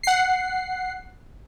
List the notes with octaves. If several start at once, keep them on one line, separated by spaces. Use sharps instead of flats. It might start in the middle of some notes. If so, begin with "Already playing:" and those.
F#5 C7